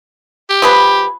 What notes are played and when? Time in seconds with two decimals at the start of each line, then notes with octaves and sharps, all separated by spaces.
0.50 G4
0.62 F3 G#4 B4